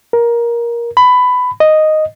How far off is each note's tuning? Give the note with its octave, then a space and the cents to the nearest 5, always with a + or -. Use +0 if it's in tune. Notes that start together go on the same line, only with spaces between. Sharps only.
A#4 +15
B5 +15
D#5 -5